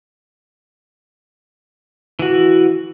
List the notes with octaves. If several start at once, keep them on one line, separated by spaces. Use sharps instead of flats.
E3 F#4